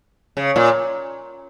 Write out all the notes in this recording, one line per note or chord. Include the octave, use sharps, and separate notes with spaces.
C#3
A#2